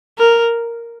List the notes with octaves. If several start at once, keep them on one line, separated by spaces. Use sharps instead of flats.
A#4